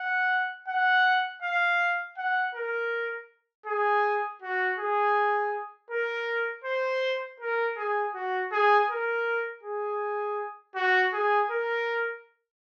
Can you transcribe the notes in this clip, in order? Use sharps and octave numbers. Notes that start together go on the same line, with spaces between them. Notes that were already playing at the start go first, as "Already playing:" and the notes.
Already playing: F#5
F#5
F5
F#5
A#4
G#4
F#4
G#4
A#4
C5
A#4
G#4
F#4
G#4
A#4
G#4
F#4
G#4
A#4